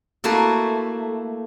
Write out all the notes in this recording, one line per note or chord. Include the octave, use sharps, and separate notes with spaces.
A3 A#3 E4 F#4 A4